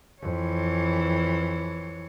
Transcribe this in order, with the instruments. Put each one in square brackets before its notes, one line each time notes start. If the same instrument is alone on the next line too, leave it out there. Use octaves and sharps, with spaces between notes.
[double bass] F2 [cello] E3 C#5